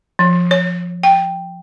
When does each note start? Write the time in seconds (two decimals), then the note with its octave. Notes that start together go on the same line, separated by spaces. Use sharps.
0.19 F3
0.51 C#5
1.03 G5